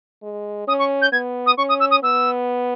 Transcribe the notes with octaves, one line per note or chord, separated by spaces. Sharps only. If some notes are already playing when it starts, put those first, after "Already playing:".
G#3
C#4 D#6
C#6
G6
B3 G#6
D#6
C#4 C#6
D#6
E6
D#6
B3 E6